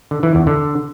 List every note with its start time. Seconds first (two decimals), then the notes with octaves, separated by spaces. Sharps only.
0.11 D3
0.23 E3
0.35 E2
0.47 D3